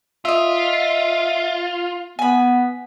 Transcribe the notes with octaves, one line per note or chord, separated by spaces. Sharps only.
F4 D#5 E5
B3 G#5 B5